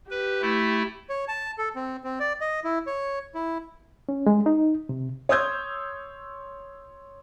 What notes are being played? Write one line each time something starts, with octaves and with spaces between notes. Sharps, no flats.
G4 B4
A3 E4
C#5
A5
A4
C4
C4
D5
D#5
E4
C#5
E4
C#4
G#3
D#4
C3
C#5 C6 D#6 E6 G6 G#6